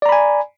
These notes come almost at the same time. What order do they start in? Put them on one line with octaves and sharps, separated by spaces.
D5 A#5 B5 G#5